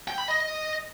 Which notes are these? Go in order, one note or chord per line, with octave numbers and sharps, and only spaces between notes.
G5
B5
D#5